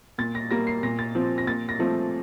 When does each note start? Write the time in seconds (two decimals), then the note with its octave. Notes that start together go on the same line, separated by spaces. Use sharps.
0.18 A#2 A6
0.35 A#6
0.51 G3 A#3 A#6
0.67 C7
0.83 A#2 A#6
0.99 A6
1.15 F3 C4
1.38 A#6
1.47 A#2 A6
1.69 A#6
1.79 F3 A3 C4